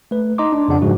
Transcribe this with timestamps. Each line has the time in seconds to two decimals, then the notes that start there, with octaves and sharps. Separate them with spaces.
0.11 A3 B4
0.38 D#4 D#5 A#5 C6 D6
0.52 D4
0.68 F2 C#3 D4 F#5
0.82 G#2 C#3 F3 G#3 F#4